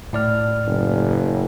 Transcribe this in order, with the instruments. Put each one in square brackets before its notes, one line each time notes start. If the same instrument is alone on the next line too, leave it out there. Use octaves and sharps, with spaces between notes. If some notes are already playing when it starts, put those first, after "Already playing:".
[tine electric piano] A2 D5 F6
[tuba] F#1